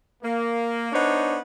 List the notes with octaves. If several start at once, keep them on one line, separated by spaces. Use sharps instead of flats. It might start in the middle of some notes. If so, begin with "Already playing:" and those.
A#3
B3 D4 D#4 C5 C#5